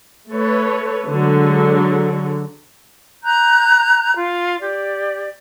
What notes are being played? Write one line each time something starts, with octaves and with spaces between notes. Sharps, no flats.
A3 A4 B4 C#5
D3 F#3 G#3
A#5 F#6 G6
F4
G4 D5